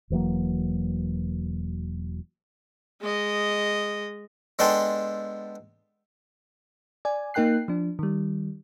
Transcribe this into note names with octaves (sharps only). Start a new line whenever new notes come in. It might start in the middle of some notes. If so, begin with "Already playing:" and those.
E1 E3 F#3 A#3
G#3 D#5
G#3 B3 D4 A4 G5 C6
D5 G#5
A#3 D#4 A#4 G5 F#6 C7
F3 D4
D#3 G3